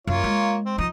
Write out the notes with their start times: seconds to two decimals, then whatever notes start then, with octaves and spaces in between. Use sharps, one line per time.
0.07 F#2 A#3 F4 C#5
0.24 G#3
0.65 C4
0.78 F3 D#4